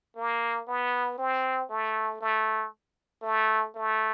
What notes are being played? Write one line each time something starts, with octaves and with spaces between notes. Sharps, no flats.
A#3
B3
C4
A3
A3
A3
A3